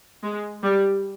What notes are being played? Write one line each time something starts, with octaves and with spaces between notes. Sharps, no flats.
G#3
G3